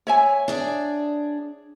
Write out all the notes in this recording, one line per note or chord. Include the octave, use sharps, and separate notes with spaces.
C#5 E5 G#5
D4 G#4 D5